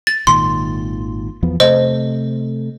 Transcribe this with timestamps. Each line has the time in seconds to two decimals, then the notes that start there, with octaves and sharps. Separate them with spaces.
0.07 A6
0.27 G#1 A#2 D#3 C6
1.43 E2 F3 B3
1.60 C3 A3 C5 D#5